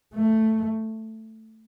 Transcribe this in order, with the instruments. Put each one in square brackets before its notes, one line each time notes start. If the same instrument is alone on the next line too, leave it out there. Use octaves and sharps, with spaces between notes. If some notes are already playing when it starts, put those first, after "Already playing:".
[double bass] A3